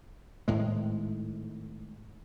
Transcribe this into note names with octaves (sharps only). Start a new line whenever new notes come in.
G#1 A2 G#3